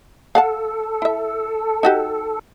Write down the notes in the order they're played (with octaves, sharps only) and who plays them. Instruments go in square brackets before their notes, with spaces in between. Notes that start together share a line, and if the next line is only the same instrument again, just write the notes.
[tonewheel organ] A4 [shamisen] F5 F#5 A5
[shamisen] E4 E5
D#4 F#4 G4